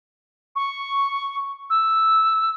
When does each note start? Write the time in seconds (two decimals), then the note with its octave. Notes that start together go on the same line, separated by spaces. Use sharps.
0.56 C#6
1.70 E6